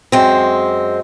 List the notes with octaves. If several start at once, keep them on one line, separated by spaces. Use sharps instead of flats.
F#2 G#3 C4